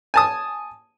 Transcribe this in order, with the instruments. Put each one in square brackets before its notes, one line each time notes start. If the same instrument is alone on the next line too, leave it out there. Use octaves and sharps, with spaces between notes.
[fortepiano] G#5 A5 D#6